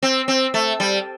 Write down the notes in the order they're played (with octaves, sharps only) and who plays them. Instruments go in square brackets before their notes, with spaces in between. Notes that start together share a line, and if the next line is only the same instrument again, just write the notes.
[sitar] C4
C4
A3
G3